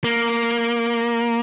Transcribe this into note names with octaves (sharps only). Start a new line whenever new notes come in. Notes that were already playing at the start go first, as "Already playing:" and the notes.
A#3